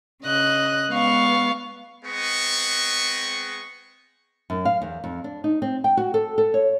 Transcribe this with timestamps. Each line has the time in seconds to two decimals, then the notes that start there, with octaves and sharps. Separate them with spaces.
0.23 C#3 D#5 F#6
0.90 G#3 B3 F5 C#6
2.04 G#3 B3 C4 B4 D#5 C#6
4.50 F#2
4.65 F5
4.82 E2
5.04 F2
5.24 D4
5.44 D#4
5.62 C4
5.84 G5
5.97 F#4
6.14 A4
6.38 A4
6.54 C#5